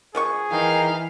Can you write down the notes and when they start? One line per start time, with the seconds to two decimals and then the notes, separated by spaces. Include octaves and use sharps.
0.15 F3 B3 G#4 C#6
0.52 E3 D#4 A#4 F5 G5